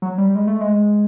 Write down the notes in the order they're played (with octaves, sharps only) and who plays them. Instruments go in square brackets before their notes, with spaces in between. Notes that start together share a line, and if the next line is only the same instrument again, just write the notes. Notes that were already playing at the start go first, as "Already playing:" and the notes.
[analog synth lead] F#3
G3
G#3
A3
G#3